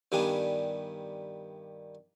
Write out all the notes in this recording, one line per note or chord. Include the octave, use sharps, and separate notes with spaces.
G2 D#3 G3 B3 D4 G#5